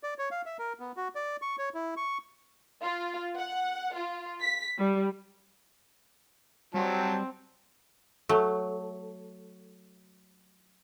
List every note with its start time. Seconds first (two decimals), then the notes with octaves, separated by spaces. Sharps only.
0.03 D5
0.19 C#5
0.31 F5
0.46 E5
0.59 A#4
0.80 B3
0.97 F#4
1.15 D5
1.42 C#6
1.58 C#5
1.74 E4
1.97 C#6
2.83 F4
3.37 F#5
3.95 F4
4.42 B6
4.78 G3
6.74 F#3 G3 C4 A5
8.29 F#3 A3